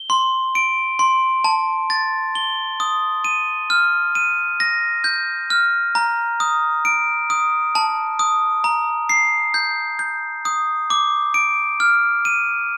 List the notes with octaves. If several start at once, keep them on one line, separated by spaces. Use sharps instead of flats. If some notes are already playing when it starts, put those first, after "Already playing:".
Already playing: G7
C6
D7
C6
A5
A6
G7
D#6
D#7
F6
D#7
A#6
G6
F6
A#5
D#6
D7
D#6
A5
D#6
A#5
C7
G6
G6
D#6
D6
D7
F6
D#7